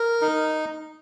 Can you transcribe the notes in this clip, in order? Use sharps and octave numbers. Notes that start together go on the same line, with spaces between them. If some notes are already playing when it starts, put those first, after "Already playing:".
Already playing: A#4
D#4